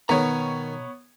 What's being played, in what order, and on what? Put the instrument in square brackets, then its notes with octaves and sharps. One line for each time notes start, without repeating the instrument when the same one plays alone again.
[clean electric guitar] B2 A#5 [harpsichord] D#3 [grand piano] B3 C#5